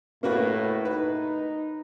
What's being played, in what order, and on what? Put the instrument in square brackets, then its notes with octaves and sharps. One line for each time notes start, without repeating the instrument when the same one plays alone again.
[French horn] A2 [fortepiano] A#3 F#4 B4
[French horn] D#4 [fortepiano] B4